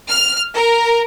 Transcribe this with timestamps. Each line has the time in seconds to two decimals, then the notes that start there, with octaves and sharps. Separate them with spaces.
0.10 F6
0.53 A#4